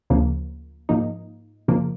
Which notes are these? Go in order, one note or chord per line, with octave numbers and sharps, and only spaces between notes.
D2 C#3 F3 A#3
G#2 F3 A#3 D#4
F2 C#3 F3 A#3